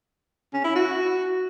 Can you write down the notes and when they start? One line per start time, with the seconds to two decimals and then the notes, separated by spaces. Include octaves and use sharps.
0.54 C#4
0.65 E4
0.75 F#4